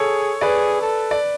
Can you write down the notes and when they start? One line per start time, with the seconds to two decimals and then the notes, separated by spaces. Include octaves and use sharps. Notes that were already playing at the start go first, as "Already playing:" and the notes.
Already playing: G#4 A4 C#5
0.41 G#4 B4 D5
0.82 A4
1.11 D5